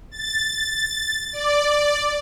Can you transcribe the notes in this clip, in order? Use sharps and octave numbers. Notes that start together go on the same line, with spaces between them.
A6
D5